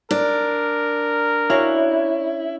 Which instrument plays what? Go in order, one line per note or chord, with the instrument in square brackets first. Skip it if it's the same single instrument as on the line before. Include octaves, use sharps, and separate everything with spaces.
[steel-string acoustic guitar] D4 [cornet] A#4
[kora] C#4 F#4 F5 [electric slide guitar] E4